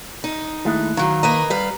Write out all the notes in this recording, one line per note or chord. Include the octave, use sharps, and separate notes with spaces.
D#4
D#2 G#3 A3 E4 F#6
G#2 D#3 F#3 F5
A#3 B4 D#5 A#5
D2 G3 B4 F5